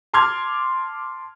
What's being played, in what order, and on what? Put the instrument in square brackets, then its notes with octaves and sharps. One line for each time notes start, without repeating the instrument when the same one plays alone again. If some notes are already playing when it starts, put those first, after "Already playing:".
[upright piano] A5 C6 D6 F6 G#6